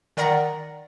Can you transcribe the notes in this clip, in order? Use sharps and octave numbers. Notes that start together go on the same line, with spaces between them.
D#3 A#4 D5 F#5 A#5 A#6